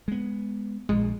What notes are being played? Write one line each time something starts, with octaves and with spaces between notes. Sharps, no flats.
G#3 B3
A#1 A#2 G#3